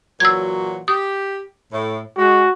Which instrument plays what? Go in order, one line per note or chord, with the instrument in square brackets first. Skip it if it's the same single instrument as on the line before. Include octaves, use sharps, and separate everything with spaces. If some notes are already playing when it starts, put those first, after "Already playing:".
[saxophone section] A#2 E3 F#3 [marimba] E6 G#6
[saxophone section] G4 [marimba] D#6
[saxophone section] A2
[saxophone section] G#3 [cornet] F#4